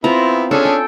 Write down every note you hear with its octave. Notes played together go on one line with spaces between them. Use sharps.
B3 C4 E4 F4 A#5
C#4 D4 G#4 A4
G5